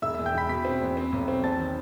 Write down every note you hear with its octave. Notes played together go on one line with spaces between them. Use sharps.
E1 E5 E6
E5 E6
E2
G5 G6
E1 B5 B6
B2 B5 B6
C4
E2
C4
B1
C4
E2 A5 A6
D#3